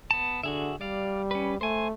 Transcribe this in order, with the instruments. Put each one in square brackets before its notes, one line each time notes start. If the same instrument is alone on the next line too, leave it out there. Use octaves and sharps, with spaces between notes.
[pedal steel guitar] B3 A5
[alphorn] D3 [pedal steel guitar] F#4 G#4 E5
[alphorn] G3 [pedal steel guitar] D5 F5
[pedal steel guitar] C#4 B4
[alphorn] A3 [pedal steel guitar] C5 G#5